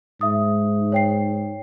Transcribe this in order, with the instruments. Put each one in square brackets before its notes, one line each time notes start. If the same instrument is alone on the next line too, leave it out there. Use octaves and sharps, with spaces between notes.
[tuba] G#2 [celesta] E5 D#6
[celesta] C#5 G5 C7